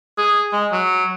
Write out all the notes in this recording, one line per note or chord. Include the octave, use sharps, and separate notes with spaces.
G#4
G#3
F#3